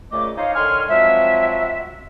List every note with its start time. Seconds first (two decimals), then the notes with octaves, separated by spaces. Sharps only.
0.12 A#2 C#3 A3 D#5 D6
0.37 D#4 C5 C#5 D#5 F5
0.55 D3 D#3 C#5 G#5 C6 F6
0.89 F3 F#3 G#3 C4 E5